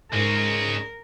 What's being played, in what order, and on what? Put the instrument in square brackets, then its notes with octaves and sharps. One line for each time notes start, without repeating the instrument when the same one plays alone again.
[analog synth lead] G#2 [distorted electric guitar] G#3 C#4 [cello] A#4